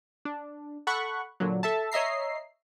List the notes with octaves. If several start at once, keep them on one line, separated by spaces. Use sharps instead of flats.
D4
A4 F#5 B5 C#6 F#6
A#2 D3 F#3
A4 E5 A5
C#5 D#5 E5 A#5 C7